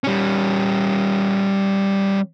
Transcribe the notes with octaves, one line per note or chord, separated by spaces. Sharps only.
G3 C#4